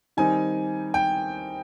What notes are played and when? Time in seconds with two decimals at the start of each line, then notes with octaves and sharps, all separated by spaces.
0.17 D#3 G3 C4 D#4 G#5
0.94 G5